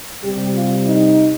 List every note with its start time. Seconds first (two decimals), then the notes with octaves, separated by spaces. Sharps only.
0.24 C3 G3 G4
0.54 F4
0.85 D#4